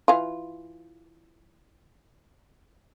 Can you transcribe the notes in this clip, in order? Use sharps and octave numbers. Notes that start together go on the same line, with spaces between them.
E3 F4